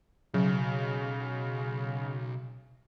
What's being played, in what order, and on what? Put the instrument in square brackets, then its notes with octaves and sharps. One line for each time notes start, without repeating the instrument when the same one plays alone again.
[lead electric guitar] B1 [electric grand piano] C#3 [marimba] F#3